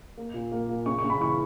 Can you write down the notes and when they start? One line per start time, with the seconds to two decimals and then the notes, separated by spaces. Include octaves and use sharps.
0.17 A#3
0.34 A#2
0.52 A#3
0.69 A#2
0.86 C#3 C#6
0.98 C#6
1.04 C#3
1.10 B5
1.20 E3 C#6